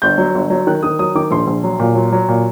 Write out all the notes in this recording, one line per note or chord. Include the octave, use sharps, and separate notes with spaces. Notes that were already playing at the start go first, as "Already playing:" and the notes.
G1 G6
F#3
G1
F#3
D#3 F#6
D#3 D#6
F#3 D#6
D#3 D6
A#1 C6
A#1
F#3
A#2
F#3
F#3
A#2